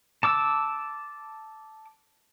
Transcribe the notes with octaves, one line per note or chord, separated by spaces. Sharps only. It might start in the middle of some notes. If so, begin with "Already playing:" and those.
A5 D6 E6